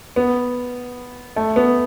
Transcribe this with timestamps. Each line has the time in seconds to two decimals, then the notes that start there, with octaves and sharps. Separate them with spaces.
0.16 B3
1.36 A3
1.56 B3